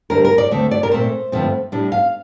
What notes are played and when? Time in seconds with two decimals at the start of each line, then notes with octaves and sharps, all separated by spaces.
0.10 D2 D3 G3 D4 A#4
0.25 A#4
0.38 D5
0.51 D2 D3 A3 C4
0.71 D5
0.83 A#4
0.91 A#2 A3 C4 C5
1.32 G2 D3 F3 A3 C4
1.72 A2 G3 D4
1.92 F5